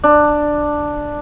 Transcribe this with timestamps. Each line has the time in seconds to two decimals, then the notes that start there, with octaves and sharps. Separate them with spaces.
0.04 D4